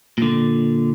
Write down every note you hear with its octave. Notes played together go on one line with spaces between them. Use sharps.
A#2 D3